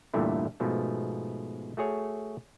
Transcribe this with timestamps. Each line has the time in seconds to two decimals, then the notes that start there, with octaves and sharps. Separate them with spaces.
0.14 E2 G2 A#2 D3 A3 E4
0.60 G#2 B2 F3 A3
1.77 A3 F#4 G#4 C#5